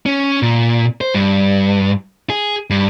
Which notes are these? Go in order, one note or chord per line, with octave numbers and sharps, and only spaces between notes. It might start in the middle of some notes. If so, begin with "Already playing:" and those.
C#4
A#2
C5
G2
G#4
G2